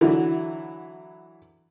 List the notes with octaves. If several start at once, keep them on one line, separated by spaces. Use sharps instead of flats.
D3 E3 F#3 E4